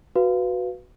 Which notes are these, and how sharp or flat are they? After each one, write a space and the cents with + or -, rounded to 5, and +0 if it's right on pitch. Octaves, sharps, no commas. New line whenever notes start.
F#4 -5 B4 +0 F5 -10